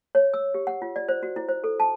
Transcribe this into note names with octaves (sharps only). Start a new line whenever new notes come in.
C#5
E6
G4
F#5
F4
D5
C5
F#4
E4
C5
A4
A5